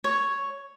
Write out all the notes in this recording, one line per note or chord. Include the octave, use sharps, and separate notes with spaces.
C#5